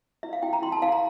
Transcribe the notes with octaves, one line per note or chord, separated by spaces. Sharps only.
E4 E5
F5
E4 G5
A#5
E4 C6
A5
E4 F5
A#5